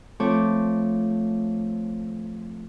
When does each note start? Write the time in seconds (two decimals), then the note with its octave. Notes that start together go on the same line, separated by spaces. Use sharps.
0.20 F3 A3 C4 A4 C#5 D6